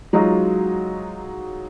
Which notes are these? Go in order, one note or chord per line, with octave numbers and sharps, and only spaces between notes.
F#3 G#3 D#4 F4 F#4